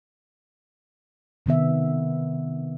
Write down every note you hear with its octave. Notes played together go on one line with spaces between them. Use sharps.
C3 D#3 B3 E5